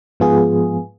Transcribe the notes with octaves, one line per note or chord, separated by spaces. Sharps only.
G#2 F3 B3 F4 G#4